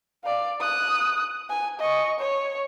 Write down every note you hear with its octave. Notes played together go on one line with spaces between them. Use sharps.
D5 F5
D#6 F#6
G#5
D#5 C#6
C#5